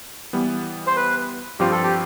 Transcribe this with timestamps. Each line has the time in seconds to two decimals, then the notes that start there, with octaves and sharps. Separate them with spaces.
0.33 E3 G3 B3
0.87 C5
0.96 B4
1.59 G2 F3 C4 F4 G4
1.71 A4
1.83 G4